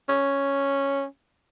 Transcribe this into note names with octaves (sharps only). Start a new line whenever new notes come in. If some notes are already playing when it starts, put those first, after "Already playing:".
C#4